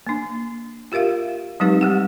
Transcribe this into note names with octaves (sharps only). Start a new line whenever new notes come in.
A#3 D4
F4 G4 A#4 E5 F5
F#3 G#3 C4 D#4 G4 B4
G3 G4 F#5